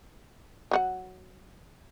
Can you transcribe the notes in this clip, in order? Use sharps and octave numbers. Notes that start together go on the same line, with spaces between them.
F#3 F#4 F#5